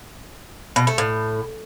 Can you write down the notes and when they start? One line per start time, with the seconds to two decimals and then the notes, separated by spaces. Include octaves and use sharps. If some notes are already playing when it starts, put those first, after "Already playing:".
0.76 B2
0.87 A3
0.98 A2